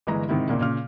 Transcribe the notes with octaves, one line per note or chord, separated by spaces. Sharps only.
G1 E3 G#3 A#5
G#2 C3 D#3 E4
A#1 A#2 C#3 A#3
A#2 C#3 F6